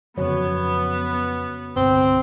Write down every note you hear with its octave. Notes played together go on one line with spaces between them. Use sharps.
F2 C#3 F3 F#3 B3 F#4 C#5
G1 C2 C4